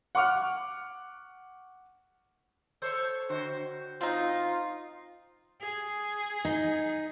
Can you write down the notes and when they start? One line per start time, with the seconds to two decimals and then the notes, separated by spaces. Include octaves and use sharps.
0.15 F#5 C#6 D6 F6
2.82 A4 C5 C#5
3.29 D3 F#4 C5
4.01 C4 D#4 F4
5.61 G#4
6.45 D#4